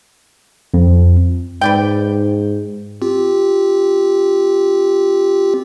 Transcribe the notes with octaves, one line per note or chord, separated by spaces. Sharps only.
F2
G#2 B4 D5 G5
C4 F4 G4